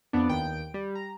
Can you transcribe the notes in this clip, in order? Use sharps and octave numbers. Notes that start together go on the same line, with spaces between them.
F2 B3 D4
D#2 G5 D7
G3
A#5